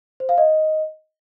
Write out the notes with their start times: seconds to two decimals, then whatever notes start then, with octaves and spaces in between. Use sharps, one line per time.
0.20 C5
0.29 F5
0.38 D#5